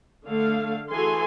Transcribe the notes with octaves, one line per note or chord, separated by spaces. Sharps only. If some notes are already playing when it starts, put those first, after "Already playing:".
D3 A3 F5
E3 F#4 G#4 A4 G#5 C6